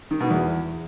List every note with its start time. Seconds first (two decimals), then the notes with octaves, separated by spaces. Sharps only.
0.11 D#3
0.20 B2
0.30 E2